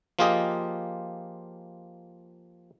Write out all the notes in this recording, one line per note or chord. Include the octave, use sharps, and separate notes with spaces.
F3 A#3 F4 G4 G#4 D#5